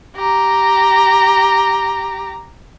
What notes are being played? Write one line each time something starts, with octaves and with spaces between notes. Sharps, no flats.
G4 A#5